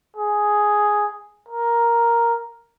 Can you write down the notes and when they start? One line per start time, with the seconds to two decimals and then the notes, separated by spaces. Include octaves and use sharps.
0.16 G#4
1.49 A#4